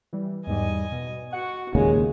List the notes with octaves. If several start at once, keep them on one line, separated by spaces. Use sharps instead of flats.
E3 G3
E2 G#2 G3 D#5 G#5
B2
F#4 F#5 C#7
D#2 A#2 C#3 G#3 G#4 G#5